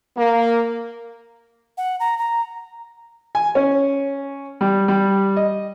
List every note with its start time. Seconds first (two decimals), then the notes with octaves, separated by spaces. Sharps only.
0.17 A#3
1.77 F#5
2.00 A#5
2.18 A#5
3.35 G#5
3.55 C#4
4.61 G3
4.88 G3
5.36 D#5